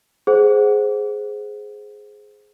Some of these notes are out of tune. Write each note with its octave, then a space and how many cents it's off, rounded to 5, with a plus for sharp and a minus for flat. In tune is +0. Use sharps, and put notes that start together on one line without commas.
G#4 +10 C5 +0 F#5 +0